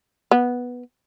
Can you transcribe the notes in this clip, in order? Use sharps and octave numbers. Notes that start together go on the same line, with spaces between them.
B3